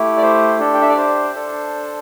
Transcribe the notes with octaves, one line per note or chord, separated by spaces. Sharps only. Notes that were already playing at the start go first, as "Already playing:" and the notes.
Already playing: A3 E4 G4
D5
C5
D4 G4 A4
G5
E5
D5
C5
D4 A4